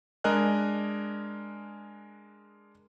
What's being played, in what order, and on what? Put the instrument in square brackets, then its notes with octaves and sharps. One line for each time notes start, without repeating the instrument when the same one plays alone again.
[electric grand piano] G#3 D4 A#4 D#5 G#5 F#6